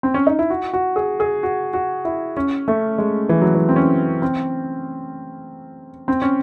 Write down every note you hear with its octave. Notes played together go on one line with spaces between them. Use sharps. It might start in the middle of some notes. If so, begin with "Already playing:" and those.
C4
C#4
D#4
E4
F#4
F#4
G#4
G#4
F#4
F#4
E4
C#4
A3
G#3
E3
F#3
E3
C4
C#4
C4
C4
C#4